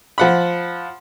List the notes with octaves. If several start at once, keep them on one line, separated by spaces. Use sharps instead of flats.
F3 F#5 B5